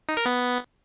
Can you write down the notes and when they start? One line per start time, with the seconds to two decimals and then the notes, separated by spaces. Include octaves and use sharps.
0.09 D#4
0.17 A#4
0.26 B3